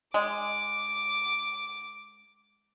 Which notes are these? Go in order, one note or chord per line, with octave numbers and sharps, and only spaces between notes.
G#3 D6